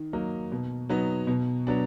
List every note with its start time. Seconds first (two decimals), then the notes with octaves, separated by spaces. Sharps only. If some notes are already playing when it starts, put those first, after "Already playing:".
Already playing: D#3
0.13 F#3 A#3 D#4
0.52 B2
0.90 F#3 B3 D#4
1.27 B2
1.67 F#3 B3 D4